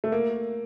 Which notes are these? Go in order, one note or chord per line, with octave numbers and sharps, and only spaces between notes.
A3
A#3